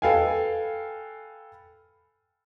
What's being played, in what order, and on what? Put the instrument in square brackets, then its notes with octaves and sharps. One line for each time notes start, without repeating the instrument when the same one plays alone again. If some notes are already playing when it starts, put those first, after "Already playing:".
[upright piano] A4 B4 F5 G5 G#5